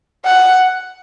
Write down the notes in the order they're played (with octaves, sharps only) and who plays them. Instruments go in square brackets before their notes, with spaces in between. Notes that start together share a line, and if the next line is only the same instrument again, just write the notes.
[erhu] F#5